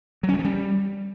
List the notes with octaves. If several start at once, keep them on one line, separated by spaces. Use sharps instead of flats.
F#3
C#4
G3
F3
G3